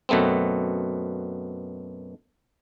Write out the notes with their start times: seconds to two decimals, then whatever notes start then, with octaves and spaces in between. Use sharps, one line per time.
0.09 F#2 B2 A3 B3 C4